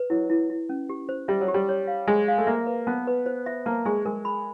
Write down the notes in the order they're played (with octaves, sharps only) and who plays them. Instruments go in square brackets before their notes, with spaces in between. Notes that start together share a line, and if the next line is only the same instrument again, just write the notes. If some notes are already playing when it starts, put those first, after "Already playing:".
Already playing: [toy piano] B4
[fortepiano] F#3 [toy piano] E4
[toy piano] E4
E4
C#4
G4
C5
[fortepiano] G3 [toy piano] E5
[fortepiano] F#3
[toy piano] G4
[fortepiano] G3
[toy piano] C#5
F5
[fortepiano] G#3 [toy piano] G#4
[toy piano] F5
[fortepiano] A3
[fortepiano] A#3 [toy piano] E5
[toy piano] B4
[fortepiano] B3 [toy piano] A5
[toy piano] B4
C5
E5
[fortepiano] A#3 [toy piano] A5
[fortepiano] G#3 [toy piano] G#4
[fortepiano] G#3 [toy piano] A#4
[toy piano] B5